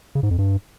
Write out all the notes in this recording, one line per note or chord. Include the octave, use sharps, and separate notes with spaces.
C#3
G#2
F2
G2